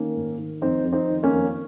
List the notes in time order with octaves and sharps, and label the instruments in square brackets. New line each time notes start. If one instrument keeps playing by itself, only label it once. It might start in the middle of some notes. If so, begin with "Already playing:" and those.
Already playing: [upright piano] D#3 A#3 C#4
G#2
D#3
F2 C4 D#4
F2
C4 D#4
D#3
A#3 C#4
F2